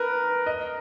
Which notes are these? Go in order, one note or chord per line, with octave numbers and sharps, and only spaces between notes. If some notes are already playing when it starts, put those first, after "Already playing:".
Already playing: A#4 B4
D#5